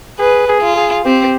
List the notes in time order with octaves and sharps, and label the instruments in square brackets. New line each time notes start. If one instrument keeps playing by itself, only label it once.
[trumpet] G#4 [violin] B4
[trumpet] G#4
[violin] F4
[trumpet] G#4
[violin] C4 [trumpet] G4